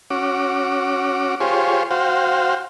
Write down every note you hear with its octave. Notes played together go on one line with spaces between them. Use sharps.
C#4 F#4 D6
F4 G4 G#4 C5 C#5
F#4 C5 F5 G5